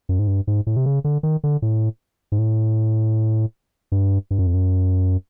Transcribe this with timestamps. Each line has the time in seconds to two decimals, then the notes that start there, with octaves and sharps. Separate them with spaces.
0.09 F#2
0.19 G#2
0.28 G2
0.47 G#2
0.67 A2
0.77 C3
0.86 C#3
1.04 D3
1.23 D#3
1.44 D3
1.62 A2
2.32 G#2
2.39 A2
3.92 G2
4.31 G2
4.39 F#2
4.47 F2
4.54 F#2